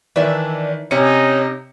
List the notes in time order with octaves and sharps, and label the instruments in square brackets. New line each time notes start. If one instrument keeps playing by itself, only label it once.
[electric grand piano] D#3 E3 B4 [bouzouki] D4 E5
[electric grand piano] C3 C#7 [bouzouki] C#4 [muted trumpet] D#4